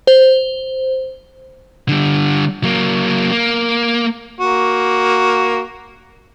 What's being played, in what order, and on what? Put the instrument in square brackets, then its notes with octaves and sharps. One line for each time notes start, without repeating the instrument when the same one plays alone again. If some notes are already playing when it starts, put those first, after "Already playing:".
[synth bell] C5
[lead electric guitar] D3 G3
F#3 A#3
A#3
[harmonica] A#3 F#4